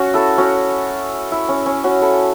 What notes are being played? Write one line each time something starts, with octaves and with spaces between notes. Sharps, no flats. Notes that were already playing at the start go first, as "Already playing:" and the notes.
Already playing: C#4 F#4
E4 A4
C#4 F#4
E4
C#4
C#4
C#4 F#4
E4 A4